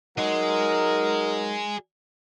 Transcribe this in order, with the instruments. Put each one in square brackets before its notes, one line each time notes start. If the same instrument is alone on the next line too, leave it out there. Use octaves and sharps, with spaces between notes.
[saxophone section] F#3 D#4 [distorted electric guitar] G#4 D#5 [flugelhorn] A#4